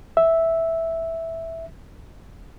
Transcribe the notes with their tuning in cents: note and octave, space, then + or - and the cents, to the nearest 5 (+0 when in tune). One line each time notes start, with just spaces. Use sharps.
E5 -5